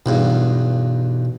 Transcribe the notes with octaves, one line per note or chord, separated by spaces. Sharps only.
B1 E2 G2 B2